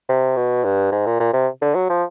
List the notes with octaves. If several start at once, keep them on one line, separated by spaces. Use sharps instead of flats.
C3
B2
G2
G#2
A#2
A#2
C3
D3
F#3
F3